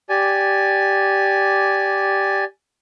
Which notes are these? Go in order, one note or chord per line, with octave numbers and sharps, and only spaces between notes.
G4 D5 G#5